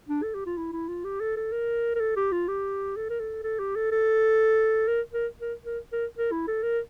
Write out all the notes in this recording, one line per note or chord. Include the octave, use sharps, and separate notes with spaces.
D4
A4
G4
F4
E4
E4
F4
G4
A4
A4
A#4
A#4
A4
G4
F4
G4
A4
A#4
A4
A4
G4
A4
A4
A#4
A#4
A#4
A#4
A#4
A#4
E4
A4
A#4